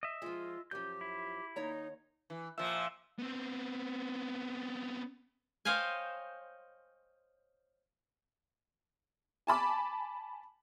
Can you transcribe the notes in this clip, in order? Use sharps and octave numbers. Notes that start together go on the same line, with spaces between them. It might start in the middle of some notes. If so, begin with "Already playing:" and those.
D#5 E5
F3 G#3 F4
F#2 F3 G4 G6
E4
D#2 D#4 C#5 A#5
E3
A#2 F3 E5
B3 C4
C5 C#5 D#5 F5 G5 G#5
G#5 A5 B5 D6